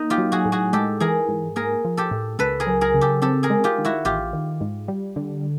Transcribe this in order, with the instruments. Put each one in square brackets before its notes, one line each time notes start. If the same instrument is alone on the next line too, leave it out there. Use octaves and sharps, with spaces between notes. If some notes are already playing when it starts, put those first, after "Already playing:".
Already playing: [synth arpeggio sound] A#3 [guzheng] D#4
[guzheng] F4 G4
[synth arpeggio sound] F#3
[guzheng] F#4 G#4
[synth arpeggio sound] A2
[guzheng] F#4 G#4
[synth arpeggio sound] G#3 [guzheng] G4 A4
[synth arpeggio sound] E3 [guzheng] G#4 A#4
[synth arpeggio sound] G#2
[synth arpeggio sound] A#3 [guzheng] G#4 A#4
[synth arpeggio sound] F3
[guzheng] G4 A4
[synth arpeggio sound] A2
[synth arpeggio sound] C#2 [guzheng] A4 B4
[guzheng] G#4 A#4
[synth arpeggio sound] F#3
[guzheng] G#4 A#4
[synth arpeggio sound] C#3
[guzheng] G4 A4
[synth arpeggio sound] C4 [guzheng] G4 A4
[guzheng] G#4 A#4
[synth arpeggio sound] G#3
[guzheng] F4 G4
[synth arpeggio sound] D#3
[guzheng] E4 F#4
[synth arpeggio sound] A1 [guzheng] F4 G4
[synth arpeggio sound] D#3
G#2
G3
D3